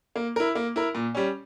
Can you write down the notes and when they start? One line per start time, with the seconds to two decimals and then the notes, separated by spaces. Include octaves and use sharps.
0.16 A#3
0.36 E4 A#4
0.55 A#3
0.76 E4 A#4
0.95 A#2
1.15 G3 C#4